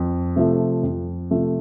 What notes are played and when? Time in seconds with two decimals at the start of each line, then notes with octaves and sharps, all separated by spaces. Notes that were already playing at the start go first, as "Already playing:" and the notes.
Already playing: F2
0.36 C3 F3 A3
0.83 F2
1.31 C3 F3 A3